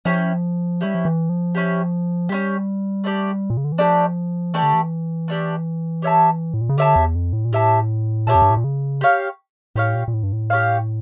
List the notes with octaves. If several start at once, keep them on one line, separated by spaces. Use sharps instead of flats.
F3 C#4 E4 G4
G3 C#4 E4 G4
F3
E3
F3
C#4 E4 G4
G3 C#4 E4 G4
A3 D4 G4 D5
A#2
C#3
D3
E3
F3 A3 D4 G4 D5
E3 A3 D4 G4 D5
D3
E3
A3 D4 G4 D5
G4 C#5 E5 A5
A2
A#2
C#3
D3 G4 C#5 E5 A5
E2
F2
A2
A#2
A2 G4 C#5 E5 A5
A#2 G4 C#5 E5 A5
F2
G2
A2
A#2
C#3
G4 C#5 F5
A2 G4 C#5 F5
A#2
A#2
A2
G2
A2
G4 C#5 F5